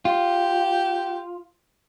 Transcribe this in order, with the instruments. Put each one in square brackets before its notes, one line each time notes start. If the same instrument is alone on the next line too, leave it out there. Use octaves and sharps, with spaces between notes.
[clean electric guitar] F4 [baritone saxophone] G4